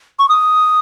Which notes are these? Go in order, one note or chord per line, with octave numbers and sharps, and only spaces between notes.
C#6
D#6